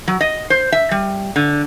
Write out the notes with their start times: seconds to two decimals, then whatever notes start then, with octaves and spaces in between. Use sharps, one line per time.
0.08 F#3
0.21 D#5
0.50 C5
0.72 E5
0.91 G3
1.36 D3